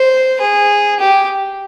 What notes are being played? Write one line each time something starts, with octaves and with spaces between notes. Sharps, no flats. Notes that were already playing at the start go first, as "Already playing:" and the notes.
Already playing: C5
G#4
G4